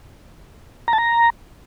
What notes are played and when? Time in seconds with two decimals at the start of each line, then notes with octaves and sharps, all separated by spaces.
0.88 A#5
0.93 A5
0.98 A#5